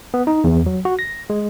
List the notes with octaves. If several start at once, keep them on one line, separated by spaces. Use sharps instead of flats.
B3
D#4
E2
F#3
F#4
A#6
G#3